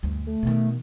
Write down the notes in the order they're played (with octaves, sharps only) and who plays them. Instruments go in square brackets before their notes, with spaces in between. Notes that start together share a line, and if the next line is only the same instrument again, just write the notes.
[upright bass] D2 [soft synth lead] G2
[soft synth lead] A3
[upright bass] B2 D#3